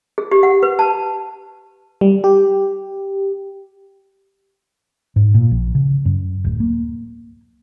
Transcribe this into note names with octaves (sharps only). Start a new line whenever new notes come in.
G#4
G4
F#5
B4
A5
G3
G4
G#2
A#2
A#1
C#3
F#2
D1
A#3